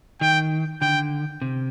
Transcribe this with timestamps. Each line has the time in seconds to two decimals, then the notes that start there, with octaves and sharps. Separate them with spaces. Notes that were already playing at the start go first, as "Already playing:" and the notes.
0.21 D#3 G5
0.82 D3 G5
1.42 C3